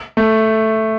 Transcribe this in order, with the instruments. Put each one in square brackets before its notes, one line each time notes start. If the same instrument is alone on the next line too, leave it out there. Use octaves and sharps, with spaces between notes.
[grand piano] A3